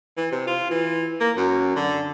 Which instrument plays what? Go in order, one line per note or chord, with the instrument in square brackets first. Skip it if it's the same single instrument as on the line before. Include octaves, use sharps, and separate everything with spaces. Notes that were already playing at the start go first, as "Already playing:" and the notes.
[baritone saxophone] E3
C3
F4
E3
A#3
F#2
D3